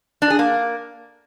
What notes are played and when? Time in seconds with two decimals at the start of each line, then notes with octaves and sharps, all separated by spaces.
0.22 D4
0.30 G#4
0.39 A#3